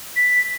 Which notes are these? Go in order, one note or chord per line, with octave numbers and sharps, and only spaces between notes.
B6